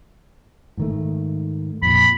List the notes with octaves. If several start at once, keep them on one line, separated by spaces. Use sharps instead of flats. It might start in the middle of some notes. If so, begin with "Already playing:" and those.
G#2 D#3 A3
F2 A#2 B5